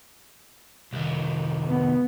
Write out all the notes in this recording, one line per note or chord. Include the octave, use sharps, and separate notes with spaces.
C2 D#3
B3